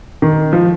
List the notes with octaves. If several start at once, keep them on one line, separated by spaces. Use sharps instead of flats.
D#3
F3